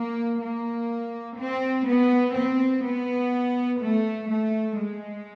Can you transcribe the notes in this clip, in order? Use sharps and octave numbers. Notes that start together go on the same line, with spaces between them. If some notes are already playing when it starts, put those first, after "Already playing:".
Already playing: A#3
A#3
C4
B3
C4
B3
A3
A3
G#3